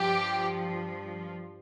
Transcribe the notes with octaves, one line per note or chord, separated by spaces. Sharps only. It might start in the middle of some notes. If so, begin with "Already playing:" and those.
Already playing: G2 F3 G4